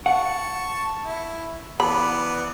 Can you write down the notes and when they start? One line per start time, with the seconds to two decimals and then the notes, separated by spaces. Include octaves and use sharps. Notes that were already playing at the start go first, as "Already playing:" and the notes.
0.06 F#5 A5 C#6
1.05 E4
1.80 E3 B3 D5 B5